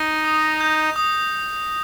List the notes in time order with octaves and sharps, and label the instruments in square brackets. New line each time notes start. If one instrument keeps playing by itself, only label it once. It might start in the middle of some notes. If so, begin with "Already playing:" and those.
Already playing: [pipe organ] D#4 [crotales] A#6
[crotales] D#6
G6
D#6